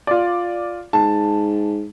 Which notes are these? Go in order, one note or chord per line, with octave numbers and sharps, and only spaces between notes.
F4 D5
G#2 A5